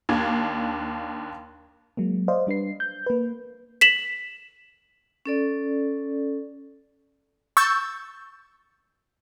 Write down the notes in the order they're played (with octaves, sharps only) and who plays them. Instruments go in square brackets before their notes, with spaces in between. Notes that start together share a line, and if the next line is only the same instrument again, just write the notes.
[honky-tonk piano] D#2 D4 F5 G#6
[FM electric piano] F#3 G#3 A#3
C5 D5 D#5 F5
G3 D4 B4 C7
G6
A#3 B4
[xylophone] B6 E7 F#7
[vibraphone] C#4 A4 D5
[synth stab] C#6 E6 G6 A6